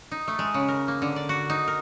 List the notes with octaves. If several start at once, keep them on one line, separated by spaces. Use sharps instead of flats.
D#4
A3
G#3
C#3
A#4
A#3
D3
D5
F#4
D#4
A#4